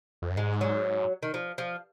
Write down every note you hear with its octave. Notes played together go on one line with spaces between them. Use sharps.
F2
F#2
G#2 G#3
F#3
D#3
F3
F3